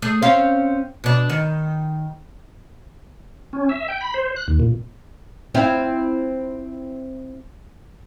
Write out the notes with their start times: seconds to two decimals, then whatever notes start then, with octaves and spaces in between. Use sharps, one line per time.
0.02 A3 G#4
0.22 C4 C#4 F5
1.04 B2 D4
1.30 D#3
3.53 C#4
3.69 E5
3.88 G5
4.01 B5
4.14 C5
4.36 F#6
4.48 D#2
4.60 A#2
5.54 C4 E4 F4